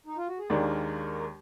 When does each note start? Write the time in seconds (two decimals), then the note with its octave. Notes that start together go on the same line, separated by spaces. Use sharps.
0.06 D#4
0.17 F4
0.28 F#4
0.39 G#4
0.50 D#2 D#3 G#3 A#3 D4 A#4